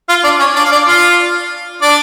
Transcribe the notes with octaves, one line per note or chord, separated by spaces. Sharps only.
F4 F5
D4 D5
C#4 C#5
D4 D5
F5
D4 D5
F4 F5
D4 D5